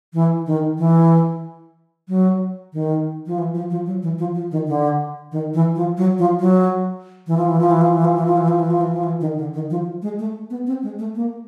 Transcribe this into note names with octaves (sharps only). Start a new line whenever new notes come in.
E3
D#3
E3
F#3
D#3
F3
E3
F3
F3
F#3
E3
F3
F3
D#3
D3
D#3
E3
F3
F#3
F3
F#3
E3
F3
E3
F3
E3
F3
E3
F3
E3
F3
E3
F3
E3
F3
E3
F3
E3
D#3
D3
D#3
F3
G#3
A3
B3
C4
G#3
A3
A#3